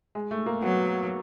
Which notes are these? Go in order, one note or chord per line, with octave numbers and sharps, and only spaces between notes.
G#3
A3
A#3
F#3 B3